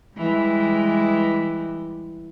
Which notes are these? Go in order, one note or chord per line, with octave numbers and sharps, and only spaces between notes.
E3 G3 G#3